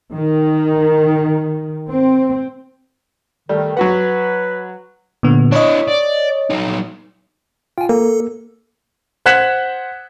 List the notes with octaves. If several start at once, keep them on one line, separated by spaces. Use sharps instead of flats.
D#3
C4
D#3 G3 A3
F#3 F#4 B4 F#5
A#2 D3 B3
D4 E4 C#5 D#5
D5
F#3 D#4
F4 G5 G#5
A#3 A4
C5 F#5 F#6 G#6 B6 E7